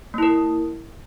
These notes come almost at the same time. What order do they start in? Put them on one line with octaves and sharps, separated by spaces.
A#3 E4 A#4